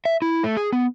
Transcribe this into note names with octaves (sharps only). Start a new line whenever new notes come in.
E5
E4
A3
G#4
B3